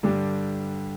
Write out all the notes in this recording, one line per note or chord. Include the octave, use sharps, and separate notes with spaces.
G2 D3 G3 D4 G4